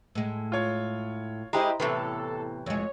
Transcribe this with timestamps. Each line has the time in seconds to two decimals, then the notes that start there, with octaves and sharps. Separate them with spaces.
0.15 A2 G#3
0.52 F4 C#5
1.53 G#3 E4 G4 C5 D#5 A#5
1.80 A2 C3 E3 B3 A4
2.66 F2 G#3 C#5